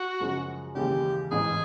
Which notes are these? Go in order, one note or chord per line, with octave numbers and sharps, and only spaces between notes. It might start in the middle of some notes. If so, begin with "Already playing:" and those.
Already playing: F#4
F#2 C#3 F3 G#3
D#2 C#3 E3 G#3 C#4 G4
A1 G#2 E3 G#4